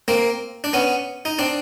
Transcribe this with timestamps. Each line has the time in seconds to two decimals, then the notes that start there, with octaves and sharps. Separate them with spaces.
0.08 A#3 C4
0.64 D4
0.73 B3 C#4
1.25 D#4
1.39 C4 D4